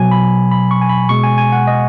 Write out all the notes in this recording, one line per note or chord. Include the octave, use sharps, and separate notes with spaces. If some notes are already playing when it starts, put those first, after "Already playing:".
Already playing: B2 F#3 G#5
B5
B5
C#6
G#5
B5
B2 G#3 C#6
G#5
G#5
F#5
D#5